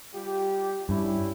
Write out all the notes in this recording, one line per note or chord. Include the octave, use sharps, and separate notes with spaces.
G3 F4 G4
G2 G3 C#4 E4